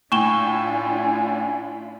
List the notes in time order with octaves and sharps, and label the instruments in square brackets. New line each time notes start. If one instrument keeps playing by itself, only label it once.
[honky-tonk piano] A2 [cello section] D4 E4 F4 [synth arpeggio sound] G#5 [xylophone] C#6 E7 G7